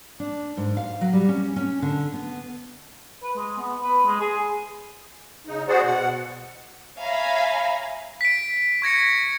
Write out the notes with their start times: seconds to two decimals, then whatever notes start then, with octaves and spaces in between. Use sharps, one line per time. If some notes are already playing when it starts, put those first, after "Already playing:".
0.20 D4
0.57 G#2
0.77 F5
1.01 F#3
1.13 G3
1.29 C#4
1.56 C#4
1.82 D3
2.14 B3
3.23 B4
3.37 G#3
3.58 B3
3.82 B4
4.06 G#3
4.20 G#4
5.47 C#3 D#4
5.68 B3 F#4 G#4 C5 D5 F#5
5.84 B2 F#5
6.99 C#5 E5 F5 G#5 A#5 B5
8.21 B6 D7
8.82 C#6 G#6 A#6 C#7